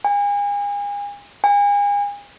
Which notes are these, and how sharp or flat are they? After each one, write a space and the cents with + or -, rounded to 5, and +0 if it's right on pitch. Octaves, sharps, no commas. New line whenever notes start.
G#5 -35
G#5 -35